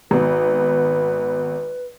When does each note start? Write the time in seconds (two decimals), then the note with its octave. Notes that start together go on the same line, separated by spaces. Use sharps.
0.11 G#1 B3 B4